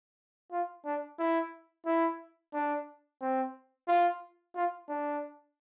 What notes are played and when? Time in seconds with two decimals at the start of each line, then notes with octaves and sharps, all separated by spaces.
0.52 F4
0.85 D4
1.19 E4
1.86 E4
2.53 D4
3.21 C4
3.88 F4
4.55 F4
4.88 D4